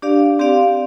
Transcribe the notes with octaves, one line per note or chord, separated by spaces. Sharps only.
D4 G4 D5 F5
C4 G4 D5 F5